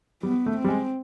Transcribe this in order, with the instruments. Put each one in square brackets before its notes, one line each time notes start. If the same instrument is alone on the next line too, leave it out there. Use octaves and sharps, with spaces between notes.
[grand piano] G3 [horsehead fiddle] B3
[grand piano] A3
[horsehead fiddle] C4
[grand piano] G3
G#3